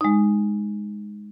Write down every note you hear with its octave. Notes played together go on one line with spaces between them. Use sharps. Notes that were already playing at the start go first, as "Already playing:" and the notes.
G#3 D#4